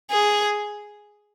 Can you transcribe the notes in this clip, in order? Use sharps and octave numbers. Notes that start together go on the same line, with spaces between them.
G#4